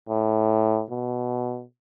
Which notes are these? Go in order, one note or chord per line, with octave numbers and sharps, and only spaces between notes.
A2
B2